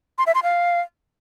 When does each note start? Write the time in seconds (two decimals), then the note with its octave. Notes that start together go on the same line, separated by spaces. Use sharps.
0.18 C6
0.27 E5
0.35 C6
0.43 F5